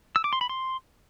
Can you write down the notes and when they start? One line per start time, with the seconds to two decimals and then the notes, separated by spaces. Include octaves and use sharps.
0.16 E6
0.24 D6
0.33 C6
0.41 B5
0.49 C6